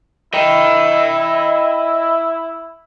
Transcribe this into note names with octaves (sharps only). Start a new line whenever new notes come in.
E4 D#5 G5